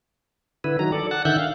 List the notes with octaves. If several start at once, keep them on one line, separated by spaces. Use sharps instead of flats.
D3 E4 B4
D#3 F#3 A#5
A4 D5
F#5 A5
D3 D#3 E5 F#6 G6
F5